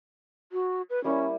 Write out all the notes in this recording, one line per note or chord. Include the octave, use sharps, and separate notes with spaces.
F#4
B4
G3 A#3 C#4 E4